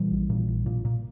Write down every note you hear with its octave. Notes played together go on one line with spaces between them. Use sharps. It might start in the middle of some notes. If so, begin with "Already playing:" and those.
Already playing: A#2 E3 G3
A#1
A#2
A#1
A#2
A#2